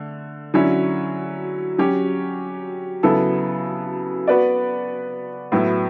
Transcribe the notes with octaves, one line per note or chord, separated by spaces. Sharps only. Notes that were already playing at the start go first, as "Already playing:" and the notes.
Already playing: D3 A3
D3 F#3 C#4 E4
F#3 C#4 G4
C#3 F#3 B3 E4 A4
B3 F#4 B4 D5
A2 F#3 B3 E4